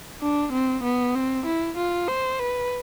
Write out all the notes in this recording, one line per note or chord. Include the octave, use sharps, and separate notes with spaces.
D4
C4
B3
C4
E4
F4
C5
B4